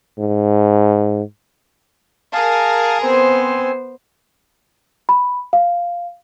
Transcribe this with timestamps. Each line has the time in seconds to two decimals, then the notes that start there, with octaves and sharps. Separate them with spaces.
0.19 G#2
2.33 G#4 A#4 F5 A5
3.03 B3 C4 C5 G#5
5.09 B5
5.53 F5